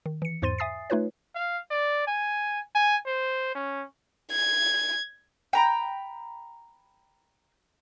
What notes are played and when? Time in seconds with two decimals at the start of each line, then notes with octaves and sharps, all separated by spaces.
0.06 D#3
0.22 E3 C#7
0.42 E2 G#2 C5 C6 A6 D#7
0.58 E5 G#5 D#6 A6 C7
0.90 A3 D#4 F4 B4 C#5
1.35 F5
1.71 D5
2.08 G#5
2.75 G#5
3.07 C5
3.55 C#4
4.32 G#6
5.53 G5 A#5 B5